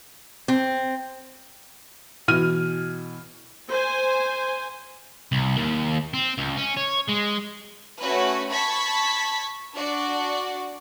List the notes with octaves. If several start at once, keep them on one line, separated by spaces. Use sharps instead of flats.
C4
B2 E3 F6 D#7
C5 G#5
C2
D#2
C4
C#2
C#4
C#5
G#3
A3 C#4 F#4 B4
A5 B5 C#6 G#6 B6
D4 F#4 D5